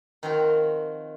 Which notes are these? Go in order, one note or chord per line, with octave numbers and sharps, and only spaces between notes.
D#3 F3 C4 F#4 A#4